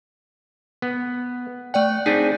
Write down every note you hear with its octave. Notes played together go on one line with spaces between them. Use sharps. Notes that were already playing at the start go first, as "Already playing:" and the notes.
B3
A3 D5 F#5 G5
C4 D4 D#4 G#4 B6 D#7